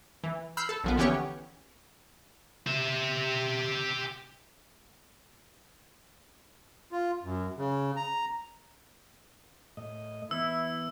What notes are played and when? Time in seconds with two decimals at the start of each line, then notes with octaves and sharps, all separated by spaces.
0.24 E3
0.57 B5 E6 F6 G6 C7
0.69 A4
0.84 A#1 F3 B3
0.97 D3 E3 B3 C#4 G4 C#5
2.67 G4 E5
6.92 F4
7.23 F#2
7.58 C#3
7.96 A#5
9.77 A2 D#5
10.31 E3 B3 E4 E6